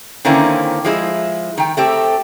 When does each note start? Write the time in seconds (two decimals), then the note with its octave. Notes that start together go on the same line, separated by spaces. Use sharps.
0.25 D3 D#3 A#3 C4 C#4 E4
0.85 F3 G#3 E4
1.58 D#3 G5
1.77 A3 C4 G4